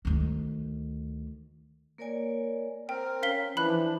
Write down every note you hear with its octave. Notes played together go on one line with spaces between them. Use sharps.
D2 D#3
A#3 A#4 C#5 D5 G#5
C4 A#4 G5
C#4 F5 B6 G7
E3 F3 D4 B5 F#6